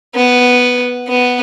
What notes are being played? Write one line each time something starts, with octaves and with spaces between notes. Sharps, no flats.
B3
B3